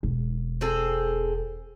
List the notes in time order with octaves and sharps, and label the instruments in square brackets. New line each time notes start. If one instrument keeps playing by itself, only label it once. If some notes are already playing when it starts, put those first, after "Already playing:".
[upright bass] E1
[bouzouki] C4 G#4 A4